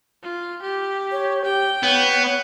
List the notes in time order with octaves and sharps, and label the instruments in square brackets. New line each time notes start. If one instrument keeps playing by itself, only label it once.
[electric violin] F4
G4
[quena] C#5
[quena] G4 [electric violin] G5
[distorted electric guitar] B3 [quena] C#5